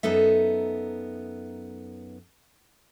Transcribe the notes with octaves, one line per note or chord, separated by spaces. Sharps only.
F#2 B3 D#4 A4 E5